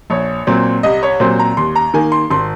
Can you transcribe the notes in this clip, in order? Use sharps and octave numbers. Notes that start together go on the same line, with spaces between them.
A#1 C#5
A#2 F#3 C4
C2 D#5
C#5
A#2 F#3 C4 C5
A#5
D#2 C6
A#5
D#3 A#3 G#5
C6
G#1 C6